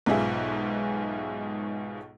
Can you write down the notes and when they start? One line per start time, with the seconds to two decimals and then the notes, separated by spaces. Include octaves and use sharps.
0.06 B1 G#2 B2 F4 G#4 E5